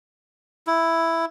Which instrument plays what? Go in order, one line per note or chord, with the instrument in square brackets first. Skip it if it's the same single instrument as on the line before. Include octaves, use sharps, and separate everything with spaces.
[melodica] E4